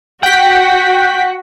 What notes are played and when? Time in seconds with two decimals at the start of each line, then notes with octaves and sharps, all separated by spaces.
0.23 F#4 F#5 G5 B6